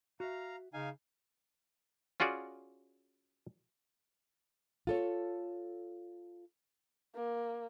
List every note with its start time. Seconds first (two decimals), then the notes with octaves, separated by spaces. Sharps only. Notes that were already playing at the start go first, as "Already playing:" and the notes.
0.20 F#4 E5 F5 A#5
0.74 C#3 D#4 F5 G#5
2.20 C#4 F4 F#4 G#4 D5
4.87 F4 A4 C#5
7.15 A#3